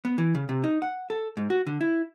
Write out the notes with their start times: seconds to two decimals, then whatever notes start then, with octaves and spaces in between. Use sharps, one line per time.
0.05 B3
0.18 E3
0.35 C#3
0.49 C3
0.64 D#4
0.82 F#5
1.10 A4
1.37 G#2
1.50 F#4
1.67 D3
1.81 E4